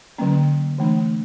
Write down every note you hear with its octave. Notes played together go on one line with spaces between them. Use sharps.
D3 F#3 A#3 C#4
E3 A3 D4